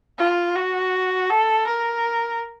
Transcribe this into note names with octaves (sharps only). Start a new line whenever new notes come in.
F4
F#4
A4
A#4